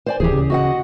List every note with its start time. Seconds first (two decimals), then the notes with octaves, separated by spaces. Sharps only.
0.06 C5 D5 G#5
0.20 D1 E3 G4 G#4
0.32 C#3
0.50 F#4 D#5 F#5